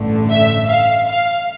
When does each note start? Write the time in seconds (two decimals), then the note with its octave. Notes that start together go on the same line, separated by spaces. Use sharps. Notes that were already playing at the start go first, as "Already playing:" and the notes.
Already playing: A1 G2 D3 A3
0.31 E5
0.70 F5
1.09 F5